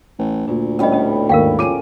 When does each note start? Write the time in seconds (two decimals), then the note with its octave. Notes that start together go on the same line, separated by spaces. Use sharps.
0.19 A1
0.47 D2 A#2
0.79 A2 G3 B3 C#4 D#5
0.92 C#4 D#5
1.29 D#2 G#2 A#4 F5 G5
1.59 C#3 F3 C#4 D6 D#7